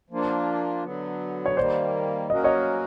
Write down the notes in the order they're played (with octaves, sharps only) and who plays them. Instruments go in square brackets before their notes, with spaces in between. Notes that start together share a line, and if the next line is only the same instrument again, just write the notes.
[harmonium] F3 A#3 D4 F4
D3 F#3 B3
[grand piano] C#5
[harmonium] D#3 G3 A#3 [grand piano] C5 D5
[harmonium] F#3 A#3 C#4 F#4 A#4 [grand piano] D#5
[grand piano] C#5 D#5